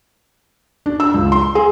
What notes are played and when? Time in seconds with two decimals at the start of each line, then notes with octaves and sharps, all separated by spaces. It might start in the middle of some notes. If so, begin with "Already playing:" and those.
0.86 D4
1.00 E6
1.14 C#2
1.32 C6
1.55 G#4